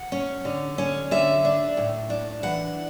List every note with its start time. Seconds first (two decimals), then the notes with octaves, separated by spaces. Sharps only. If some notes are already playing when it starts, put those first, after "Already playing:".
Already playing: F#5
0.12 C#4
0.45 D3
0.78 C#4
1.11 D3 E5
1.45 D4
1.77 A2
2.10 D4
2.43 E3 F#5